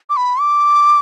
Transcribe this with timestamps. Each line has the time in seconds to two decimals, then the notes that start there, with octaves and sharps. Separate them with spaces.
0.10 D6
0.17 B5
0.40 D6